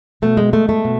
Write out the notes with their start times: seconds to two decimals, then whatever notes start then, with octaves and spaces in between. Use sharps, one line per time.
0.22 B2 A3
0.37 G#3
0.53 G#3 A3
0.69 A3
0.85 B2